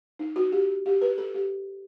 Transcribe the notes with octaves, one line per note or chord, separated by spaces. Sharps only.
D#4
F#4
G4
G4
B4
A4
G4